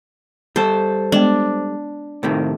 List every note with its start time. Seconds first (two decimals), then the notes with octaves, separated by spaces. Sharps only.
0.56 G3 A4 C5
1.12 G#3 B3 D4
2.23 A2 C3 D#3